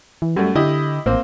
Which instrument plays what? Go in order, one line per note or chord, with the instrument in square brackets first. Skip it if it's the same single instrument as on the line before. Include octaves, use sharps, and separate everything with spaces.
[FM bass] E3
[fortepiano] F#2 A3 [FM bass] G3
[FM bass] D3 [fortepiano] E4 G4 D#5
[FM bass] A1 [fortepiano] A#3 C4 C5